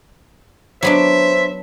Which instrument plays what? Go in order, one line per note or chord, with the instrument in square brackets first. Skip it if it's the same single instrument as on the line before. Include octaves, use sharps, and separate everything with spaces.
[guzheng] F#3 B3 D4 [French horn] C5 [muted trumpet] E5